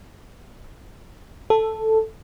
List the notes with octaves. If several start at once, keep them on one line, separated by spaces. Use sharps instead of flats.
A4